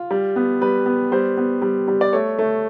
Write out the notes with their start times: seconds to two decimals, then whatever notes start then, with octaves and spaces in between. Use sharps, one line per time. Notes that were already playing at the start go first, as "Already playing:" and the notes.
Already playing: F4
0.11 G3
0.36 B3
0.62 G3 B4
0.86 B3
1.12 G3 C5
1.37 B3
1.62 G3
1.88 G3
2.01 D5
2.13 A3 C#5
2.39 A3